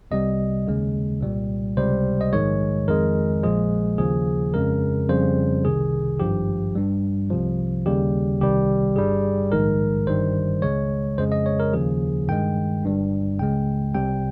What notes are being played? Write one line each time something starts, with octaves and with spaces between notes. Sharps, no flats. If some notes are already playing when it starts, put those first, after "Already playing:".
C2 C3 G3 D#5
D#2 C#3 G#3
C2 A#2 G3
C#2 C3 G3 C5
D#5
A#1 G#2 D#3 G#3 C#5
F2 D#3 G#3 A#4
A#1 A#2 F3 G#3 G#4
D#2 C#3 F3 G#4
F2 C#3 G#3 A#4
F2 C#3 G3 C5
C2 C3 D#3 G#4
G#1 G2 F3 G4
G2 G3
C2 C3 F3
D#2 C#3 G3 G4
C2 C3 D#3 G3 G4
G1 G2 G3 G#4
A#1 G#2 D#3 G#3 A#4
G1 G2 D#3 G3 C5
C#2 C#3 G#3 C#5
F2 C#3 G#3 C5
D#5
C#5
A#4
D#2 C#3 F3 G#4
G2 D#3 G#3 G5
G1 G2 G3
C#2 C#3 G#3 G5
C2 C3 G3 G5